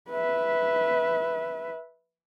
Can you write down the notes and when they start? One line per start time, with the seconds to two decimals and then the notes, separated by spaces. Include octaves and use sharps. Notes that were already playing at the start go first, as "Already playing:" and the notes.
0.10 B4 E5